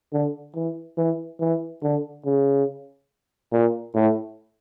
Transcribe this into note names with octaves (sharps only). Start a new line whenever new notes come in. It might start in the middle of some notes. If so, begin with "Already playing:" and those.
D3
E3
E3
E3
D3
C#3
A#2
A2